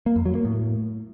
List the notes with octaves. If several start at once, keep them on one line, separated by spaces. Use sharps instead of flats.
A#3
F2
F#3
A#3
A2